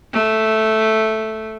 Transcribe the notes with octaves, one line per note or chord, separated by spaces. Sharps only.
A3